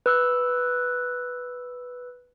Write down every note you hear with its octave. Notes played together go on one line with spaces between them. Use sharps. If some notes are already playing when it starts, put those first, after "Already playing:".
B4 E6 F#6